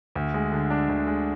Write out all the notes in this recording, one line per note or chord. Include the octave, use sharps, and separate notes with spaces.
D2
G#3
D3
D4
D2
G#3